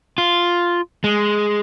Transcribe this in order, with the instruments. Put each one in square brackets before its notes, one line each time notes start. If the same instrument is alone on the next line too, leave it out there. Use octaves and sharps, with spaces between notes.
[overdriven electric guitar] F4
G#3